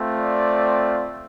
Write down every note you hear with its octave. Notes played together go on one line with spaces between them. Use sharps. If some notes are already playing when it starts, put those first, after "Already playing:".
Already playing: A3 C4 F4
D5